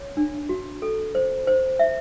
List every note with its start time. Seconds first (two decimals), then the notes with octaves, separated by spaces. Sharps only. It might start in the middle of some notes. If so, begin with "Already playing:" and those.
Already playing: C#5
0.17 D4
0.49 F#4
0.82 A4
1.15 C5
1.47 C5
1.79 E5